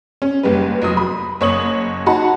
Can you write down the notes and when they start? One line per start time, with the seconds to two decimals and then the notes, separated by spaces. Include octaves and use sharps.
0.22 C#4
0.43 F#1 G3 B4
0.82 F1 F#3 D#6
0.97 B5
1.41 F#1 C#5 D#6 F#7
2.06 D#4 F#4 F#5 A5 B5